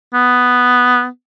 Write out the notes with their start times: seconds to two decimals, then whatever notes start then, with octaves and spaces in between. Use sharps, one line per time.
0.14 B3